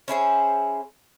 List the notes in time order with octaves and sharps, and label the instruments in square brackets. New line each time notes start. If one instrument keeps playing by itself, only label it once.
[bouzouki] C#4 E4 G#4 C5